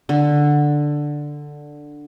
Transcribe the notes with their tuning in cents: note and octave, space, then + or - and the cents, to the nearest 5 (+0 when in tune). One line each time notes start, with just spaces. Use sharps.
D3 +5